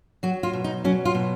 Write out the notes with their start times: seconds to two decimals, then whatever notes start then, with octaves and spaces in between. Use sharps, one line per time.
0.23 F#3 F#4
0.43 F4
0.53 B2
0.64 D#4
0.84 F#3 C#4
1.05 F4
1.15 B2